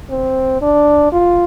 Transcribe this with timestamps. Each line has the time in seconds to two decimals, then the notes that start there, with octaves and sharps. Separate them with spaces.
0.10 C4
0.62 D4
1.12 F4